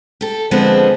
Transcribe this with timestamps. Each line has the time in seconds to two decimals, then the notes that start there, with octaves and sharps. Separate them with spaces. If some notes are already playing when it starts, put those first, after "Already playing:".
0.21 G4 A4
0.51 D3 F3 G#3 B3 C4 G#4